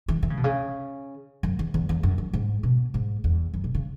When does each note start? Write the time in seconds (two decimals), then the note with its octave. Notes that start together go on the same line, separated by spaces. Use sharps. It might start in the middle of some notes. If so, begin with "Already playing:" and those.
0.08 E3
0.23 E3
0.30 C#3
0.37 B2
0.44 C#3
1.43 F#2
1.59 E2
1.74 E2
1.89 E2
2.03 F#2
2.18 F#2
2.33 G#2
2.63 B2
2.94 G#2
3.24 E2
3.54 F#2
3.64 B2
3.75 C#3